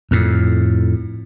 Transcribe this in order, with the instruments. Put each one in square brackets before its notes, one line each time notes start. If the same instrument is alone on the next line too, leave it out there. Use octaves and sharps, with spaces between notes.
[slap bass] F2 A2